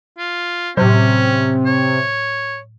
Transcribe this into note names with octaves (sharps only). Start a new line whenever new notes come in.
F4
A2 C3 F#3 C#4
C#5